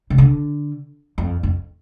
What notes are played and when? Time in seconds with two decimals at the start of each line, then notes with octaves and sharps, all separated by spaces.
0.10 C3
0.18 D3
1.18 F2
1.43 F2